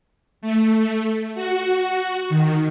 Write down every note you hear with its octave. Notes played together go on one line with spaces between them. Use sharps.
A3
F#4
D#3